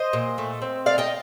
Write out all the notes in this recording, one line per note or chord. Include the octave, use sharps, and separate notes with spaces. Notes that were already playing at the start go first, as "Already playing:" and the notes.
Already playing: C5 D#5
A#2
A3
C4
A3 D5 F5
D#5 G5